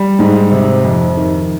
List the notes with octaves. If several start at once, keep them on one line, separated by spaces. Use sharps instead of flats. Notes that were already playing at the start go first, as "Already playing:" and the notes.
Already playing: G3
G#2
C3
F2
D#3